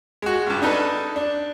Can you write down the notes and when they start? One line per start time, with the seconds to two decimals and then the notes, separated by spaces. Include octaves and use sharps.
0.22 G#3 F#4
0.47 C#2 G2
0.62 D4 D#4 A4 B4
1.16 D4